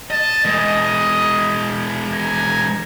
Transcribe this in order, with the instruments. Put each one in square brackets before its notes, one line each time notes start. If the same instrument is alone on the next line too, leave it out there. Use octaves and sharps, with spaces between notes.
[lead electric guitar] D#5 [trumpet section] A5
[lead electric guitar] E3 G#3 [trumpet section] D#5
[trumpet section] G#5 A#5